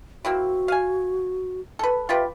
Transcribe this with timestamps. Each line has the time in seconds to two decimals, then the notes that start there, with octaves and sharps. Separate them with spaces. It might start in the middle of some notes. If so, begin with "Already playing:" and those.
0.25 A#3 C4 E4 F#4
0.68 F5 G#5
1.79 A4 B4
2.09 F4 G4 B4 E5